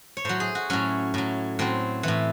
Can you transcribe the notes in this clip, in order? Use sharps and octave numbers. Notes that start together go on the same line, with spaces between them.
C#5
A2 F#3 C5
G#4
F#4
A2 F#3 C#4
A2 F#3
A2 F#3 C4
A2 E3